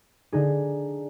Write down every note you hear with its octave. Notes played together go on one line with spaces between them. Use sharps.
D3 D#4 G#4